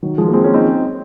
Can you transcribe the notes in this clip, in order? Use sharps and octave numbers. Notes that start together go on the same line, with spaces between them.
D#3 F#3
F3 G#3
A#3
G#3 C4
A#3 C#4
C4 D#4